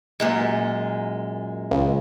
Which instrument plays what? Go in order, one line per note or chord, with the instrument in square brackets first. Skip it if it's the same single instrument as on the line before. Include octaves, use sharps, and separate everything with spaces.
[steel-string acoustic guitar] F#2 A#2 G#3
[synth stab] C#2